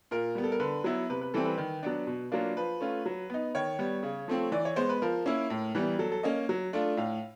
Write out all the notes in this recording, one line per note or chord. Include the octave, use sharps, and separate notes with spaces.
A#2 A#4
G3 B3
A4
A#4
D3 B4
F#3 B3 E4
C3 B4
B4
E3 G3 C4 A4
B4
D#3
F#3 B3 D4
B2
F#3 A#3 D4 F4
F3 B4
A3 C#4 F4
F#3
B3 D#4
D#3 C#5
G3 B3
C#3
F3 A3 C4
E3 D5
C#5
G#3 B3 C5
B4
F3 A#4
A#3 C#4 E4
A2
E3 G3 B3
F#3 A4
A4
A#3 C#4 D#5
F#3
A3 D4 F4
A2 F5